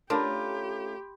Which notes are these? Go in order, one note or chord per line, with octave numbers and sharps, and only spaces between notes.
A3 C#4 D4 F4 G4 A#4 B5 C6